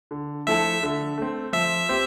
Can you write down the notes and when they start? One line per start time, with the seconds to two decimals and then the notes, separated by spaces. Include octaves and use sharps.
0.11 D3
0.47 F3 A3 E4 A4 E5
0.83 D3
1.18 A3 C4
1.53 F3 E5
1.89 C4 G4 C5